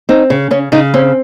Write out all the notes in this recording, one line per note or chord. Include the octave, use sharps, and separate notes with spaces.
C4 D#4
C#3
C#3 C#4
C#3 D#4
C4 C#4